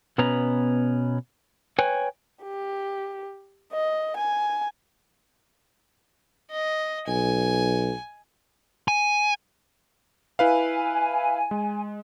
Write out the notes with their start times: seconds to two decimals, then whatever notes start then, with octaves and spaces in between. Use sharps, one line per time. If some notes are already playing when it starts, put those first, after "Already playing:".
0.18 B2 B3 C#4 B4 A#5
1.79 B4 C#5 G5 G#5
2.43 G4
3.72 D#5
4.17 G#5
6.51 D#5
7.07 B1 G#5
8.88 G#5
10.39 E4 B4 F5 G#5
11.51 G#3